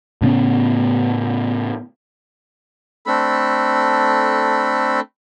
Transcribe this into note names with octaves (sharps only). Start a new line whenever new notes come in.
A2 C#3 B3 C#4
A3 C4 D4 A4 B5